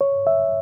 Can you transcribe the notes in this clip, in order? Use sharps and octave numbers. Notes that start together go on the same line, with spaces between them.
C#5
E5